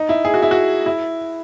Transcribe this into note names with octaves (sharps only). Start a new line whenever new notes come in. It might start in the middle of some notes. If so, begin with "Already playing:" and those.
Already playing: D#4
E4
G#4
F#4
E4
F#4
E4